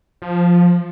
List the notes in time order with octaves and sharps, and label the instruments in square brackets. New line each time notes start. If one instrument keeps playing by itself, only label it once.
[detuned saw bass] F3